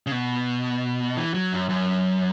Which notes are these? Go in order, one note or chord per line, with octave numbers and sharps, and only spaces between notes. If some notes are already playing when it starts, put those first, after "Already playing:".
C#3
B2
E3
F#3
F#2
F#2